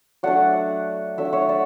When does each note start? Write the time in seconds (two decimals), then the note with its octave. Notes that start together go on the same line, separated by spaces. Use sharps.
0.23 F#3 A3 D4 D5 F#5
1.18 F#3 A3 D4 E5
1.25 F#5
1.33 C#5 E5
1.49 D5 F#5